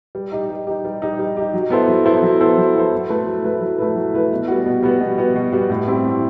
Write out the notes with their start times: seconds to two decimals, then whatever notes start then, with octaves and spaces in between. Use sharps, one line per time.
0.15 G3
0.32 D#4 G4
0.49 G3
0.67 D#4 G4
0.85 G3
1.02 D#4 G4
1.19 G3
1.37 D#4 G4
1.53 F#3
1.70 B3 E4 A4 C5
1.88 F#3
2.05 B3 E4 A4 C5
2.23 F#3
2.40 B3 E4 A4 C5
2.58 F#3
2.75 B3 E4 A4 C5
2.92 F#3
3.09 A3 E4 B4
3.27 F#3
3.44 A3 E4 B4
3.61 F#3
3.79 A3 E4 B4
3.96 F#3
4.14 A3 E4 B4
4.31 B2
4.48 G3 B3 F#4
4.66 B2
4.82 G3 B3 F#4
5.01 B2
5.18 G3 B3 F#4
5.35 B2
5.52 G3 B3 F#4
5.70 A2
5.87 G3 C4 E4
6.04 A2